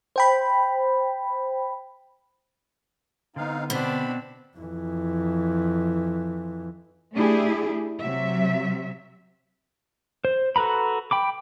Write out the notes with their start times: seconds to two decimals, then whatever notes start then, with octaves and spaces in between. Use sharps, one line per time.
0.16 C5 G5 B5
3.36 D3 B3 C4 D#4 F5
3.70 B2 C4 D4 B5
4.57 F2 E3
7.14 A3 D4 E4 G4 G#4
8.00 C3 F#3 E5
10.25 C5
10.56 F#4 A4 B4 A#5 B5
11.11 G5 B5 D6